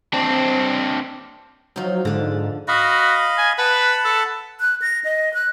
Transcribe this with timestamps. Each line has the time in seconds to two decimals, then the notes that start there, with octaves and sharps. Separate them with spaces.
0.13 C4 D4
1.76 F3 F#3 D#4
2.05 G#2 D3 D4
2.68 F#4 D#5 F5 B5
3.38 G#5
3.58 B4 F#5 A5 B5
4.05 A4
4.60 F#6
4.82 A#6
5.04 D#5
5.34 F#6